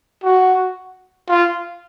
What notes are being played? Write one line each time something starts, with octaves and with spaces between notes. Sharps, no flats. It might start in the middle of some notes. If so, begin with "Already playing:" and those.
F#4
F4